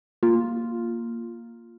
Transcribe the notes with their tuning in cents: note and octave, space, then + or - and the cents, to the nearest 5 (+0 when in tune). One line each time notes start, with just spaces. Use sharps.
A#3 +0 F4 +0